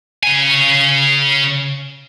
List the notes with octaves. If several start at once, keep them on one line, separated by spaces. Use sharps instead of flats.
C#3 G#5